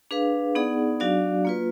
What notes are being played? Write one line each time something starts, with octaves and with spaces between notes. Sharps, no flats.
D4 G#4 B4 F5
B3 D#4 G#4 D5 F#5
F#3 D4 F#4 D5 F5
A#3 F4 B4